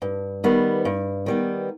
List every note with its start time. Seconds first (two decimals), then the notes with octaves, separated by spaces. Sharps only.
0.02 G2
0.44 D#3 G3 B3
0.85 G2
1.26 D#3 G3 B3